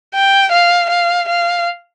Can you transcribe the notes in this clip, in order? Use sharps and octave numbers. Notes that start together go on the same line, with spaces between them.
G5
F5
F5
F5